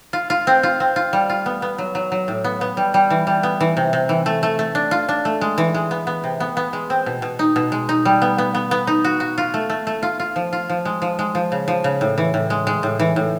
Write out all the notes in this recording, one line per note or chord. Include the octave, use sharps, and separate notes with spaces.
F4
F4
C4
F4
C4
F4
G3
F4
B3
B3
F#3
F#3
F#3
A2
B3
B3
G3
G3
E3
G3
B3
E3
C3
C3
E3
A3
A3
A3
D4
F4
D4
A3
G#3
E3
G#3
B3
B3
C3
B3
B3
G#3
C4
B2
B2
D#4
B2
G#3
D#4
G3
B3
B3
B3
B3
D#4
F#4
F#4
F4
A3
A3
A3
F4
F4
F3
F4
F3
G#3
F3
G#3
F3
C#3
F3
C#3
A2
E3
A2
G#3
G#3
A2
E3
A2